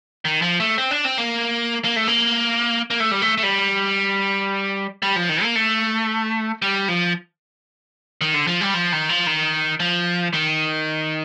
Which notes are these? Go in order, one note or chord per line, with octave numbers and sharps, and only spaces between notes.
D#3
F3
A3
C4
D4
C4
A#3
A#3
A3
A#3
A#3
A3
G3
A3
A3
G3
G3
F3
D#3
A#3
A3
G3
F3
D#3
D3
F3
G3
F3
D#3
F3
D#3
F3
D#3